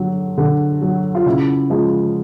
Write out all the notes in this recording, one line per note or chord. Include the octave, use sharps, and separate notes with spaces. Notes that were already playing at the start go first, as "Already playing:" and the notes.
Already playing: D3 F#3
D3
F#3
F4
C#3 E4
F3 G#3